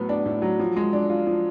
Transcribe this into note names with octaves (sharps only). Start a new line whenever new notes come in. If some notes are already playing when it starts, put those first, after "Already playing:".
Already playing: A2 F#3 B3
D4
A2
F#3
F3
G#3
D4
F4
F3